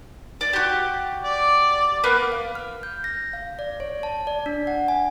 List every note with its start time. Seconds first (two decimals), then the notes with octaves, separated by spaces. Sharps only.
0.41 D5
0.53 F#4 G4
1.24 D5
2.04 A#3 B3
2.32 F5
2.55 F6
2.83 G6
3.04 A#6
3.33 F5
3.59 D5
3.80 C#5
4.03 A5
4.27 D5
4.46 D4
4.67 F#5
4.88 G#5